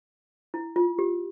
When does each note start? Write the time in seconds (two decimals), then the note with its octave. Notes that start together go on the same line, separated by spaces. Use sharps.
0.54 E4
0.76 F4
0.99 G4